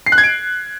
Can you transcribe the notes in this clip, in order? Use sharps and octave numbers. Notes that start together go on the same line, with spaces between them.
C7
F#6
G#6
D7